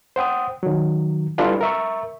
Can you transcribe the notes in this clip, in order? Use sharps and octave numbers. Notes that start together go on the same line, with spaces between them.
C5 F#5 G5 D#6
D#3 F#3
G3 D4 E4 F4 A4 B4
A#4 E5 C#6